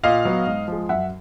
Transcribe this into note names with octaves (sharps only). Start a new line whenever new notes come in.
A#2 D#5 F5
F#3 B3
G#2
F3 G#3
F#2 E5 F#5